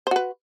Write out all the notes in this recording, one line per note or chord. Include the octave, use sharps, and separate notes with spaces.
F#4 B4 C5